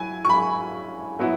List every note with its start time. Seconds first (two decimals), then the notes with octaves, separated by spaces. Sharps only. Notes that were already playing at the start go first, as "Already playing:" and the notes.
Already playing: F#3 E4 G#5
0.25 C#6
0.29 B5
1.19 F#3 B3 E4